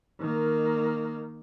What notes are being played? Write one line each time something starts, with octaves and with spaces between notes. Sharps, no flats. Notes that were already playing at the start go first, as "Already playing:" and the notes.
D#3 A#3